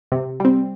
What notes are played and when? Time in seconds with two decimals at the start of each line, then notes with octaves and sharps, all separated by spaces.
0.12 C3
0.40 G3 C4